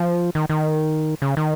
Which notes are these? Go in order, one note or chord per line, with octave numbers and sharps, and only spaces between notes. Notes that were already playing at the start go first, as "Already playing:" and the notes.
Already playing: F3
D#3
D#3
C#3
D#3